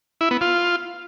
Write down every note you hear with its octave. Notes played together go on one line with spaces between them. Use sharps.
E4
B3
F4